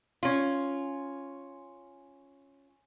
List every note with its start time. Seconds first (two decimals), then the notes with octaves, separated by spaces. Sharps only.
0.23 C#4 F4